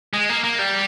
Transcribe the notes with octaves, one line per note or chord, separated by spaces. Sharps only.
G#3
A#3
A#3
G3